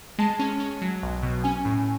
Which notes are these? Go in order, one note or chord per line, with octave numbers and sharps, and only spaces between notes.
G#3 A5
C#4
C#4
F#3
B1
B2
C#4 G#5
A2